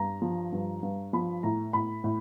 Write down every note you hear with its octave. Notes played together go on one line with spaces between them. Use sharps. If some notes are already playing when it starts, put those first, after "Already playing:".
Already playing: G2 A#5
F3
G2
G2
F3 B5
A2 A#5
A2 B5
A2